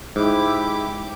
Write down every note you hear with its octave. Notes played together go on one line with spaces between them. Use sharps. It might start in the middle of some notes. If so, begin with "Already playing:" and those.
G#2 E4 G4 D6